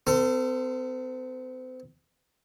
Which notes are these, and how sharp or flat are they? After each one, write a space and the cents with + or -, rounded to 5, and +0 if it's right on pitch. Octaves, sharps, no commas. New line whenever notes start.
C4 -35 A4 +30 C6 +0